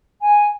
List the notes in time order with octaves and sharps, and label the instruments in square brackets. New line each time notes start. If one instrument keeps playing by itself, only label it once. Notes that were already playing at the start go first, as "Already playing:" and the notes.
[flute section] G#5